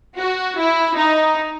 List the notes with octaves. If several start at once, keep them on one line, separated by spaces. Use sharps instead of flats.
F#4
E4
D#4